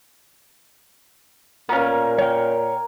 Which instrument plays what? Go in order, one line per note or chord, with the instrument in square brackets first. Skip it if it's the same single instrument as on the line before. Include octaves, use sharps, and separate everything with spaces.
[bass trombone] A#2 [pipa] B3 C#4 [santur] A#4 F5
[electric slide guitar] C#5 G5